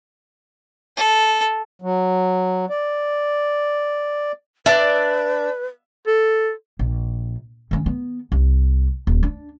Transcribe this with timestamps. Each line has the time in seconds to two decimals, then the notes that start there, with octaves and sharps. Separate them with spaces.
0.97 A4
1.82 F#3
2.70 D5
4.66 D4 B4 D5 E5
6.07 A4
6.79 A#1
7.71 D#3 C#4
7.86 B3
8.32 C2
9.07 D#1
9.23 D4